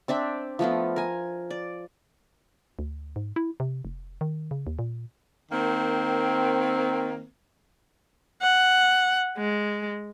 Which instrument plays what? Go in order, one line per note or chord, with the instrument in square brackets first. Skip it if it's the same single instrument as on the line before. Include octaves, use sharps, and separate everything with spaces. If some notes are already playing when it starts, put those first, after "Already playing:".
[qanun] C4 D4 E5 G5
F3 A3 B3 F4
A#4 G#5
D5
[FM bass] D2
G#2
E4
C3
F1
D#3
C#3
D#2
A#2
[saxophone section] D#3 A#3 C4
[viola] F#5
G#3